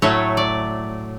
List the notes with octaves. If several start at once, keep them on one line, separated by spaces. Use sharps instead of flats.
A2 F#3 A3 C#5
D5